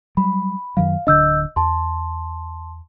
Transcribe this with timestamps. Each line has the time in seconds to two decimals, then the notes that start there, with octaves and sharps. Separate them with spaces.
0.17 F#3 G3 B5
0.77 F#2 D#3 F#3 F5
1.07 D1 D3 D4 D#5 E6 G6
1.56 E2 A5 C6